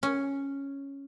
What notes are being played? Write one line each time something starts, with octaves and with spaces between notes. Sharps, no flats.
C#4